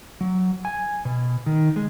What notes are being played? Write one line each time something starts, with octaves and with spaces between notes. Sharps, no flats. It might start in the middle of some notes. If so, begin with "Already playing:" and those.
F#3
G#5
B2
D#3
G#3